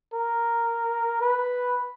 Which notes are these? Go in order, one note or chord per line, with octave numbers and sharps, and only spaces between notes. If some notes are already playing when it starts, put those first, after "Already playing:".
A#4
B4